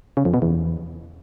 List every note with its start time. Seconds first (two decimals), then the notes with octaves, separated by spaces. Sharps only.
0.17 C#3
0.25 F2
0.34 B2
0.42 E2